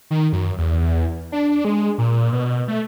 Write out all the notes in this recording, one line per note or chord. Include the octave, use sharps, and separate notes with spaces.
D#3
F#2
E2
D4
G#3
A#2
B2
A3